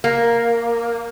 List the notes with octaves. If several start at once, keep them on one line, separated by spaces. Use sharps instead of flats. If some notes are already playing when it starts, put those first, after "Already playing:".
A#3